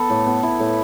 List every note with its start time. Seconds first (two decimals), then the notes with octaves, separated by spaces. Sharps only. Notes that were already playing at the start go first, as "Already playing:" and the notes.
Already playing: B3 A4 B4
0.10 A2
0.26 B3
0.43 B3 E4
0.59 A2
0.67 B4